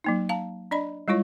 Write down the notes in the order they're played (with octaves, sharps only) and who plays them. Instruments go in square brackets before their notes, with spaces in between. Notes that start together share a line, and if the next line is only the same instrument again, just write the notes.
[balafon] F#3 A#3 D#4
F5 A5 A#5
D4 D5 D#5 B5
G3 G#3 E4 F4 C#5